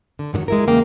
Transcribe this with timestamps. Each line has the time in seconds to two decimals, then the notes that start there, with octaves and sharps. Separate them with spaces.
0.19 D3
0.33 G#2 B2 D3 D#3 F#3
0.48 G#3 E4 A#4
0.67 E2 C#3 A#3 G5